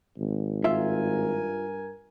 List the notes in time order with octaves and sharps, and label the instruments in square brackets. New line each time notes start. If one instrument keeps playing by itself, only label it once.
[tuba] G#1
[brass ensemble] G2 A#4 G#5 [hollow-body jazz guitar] F4 E5